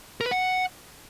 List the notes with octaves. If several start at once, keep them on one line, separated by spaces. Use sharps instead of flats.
A#4
B4
F#5